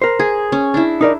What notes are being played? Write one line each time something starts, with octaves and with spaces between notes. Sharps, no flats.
A#4 C5
G#4
C#4
D4 E4
D#4 A#4 D5